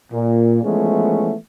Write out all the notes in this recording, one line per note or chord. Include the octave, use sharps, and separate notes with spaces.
A#2
E3 F3 G#3 A3 B3 C#4